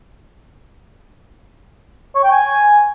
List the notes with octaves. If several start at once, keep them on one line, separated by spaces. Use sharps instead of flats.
C#5
G5
G#5